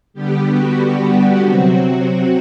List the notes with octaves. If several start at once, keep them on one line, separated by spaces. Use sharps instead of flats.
D3 G3 B3 G4
F#4
G4
F#4
C3 F#3 C4
F#4